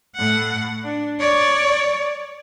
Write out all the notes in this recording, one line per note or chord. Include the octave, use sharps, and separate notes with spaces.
A2 F#5
D4
C#5 D5